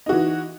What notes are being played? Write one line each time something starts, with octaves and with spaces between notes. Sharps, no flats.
E3 D#4 F#4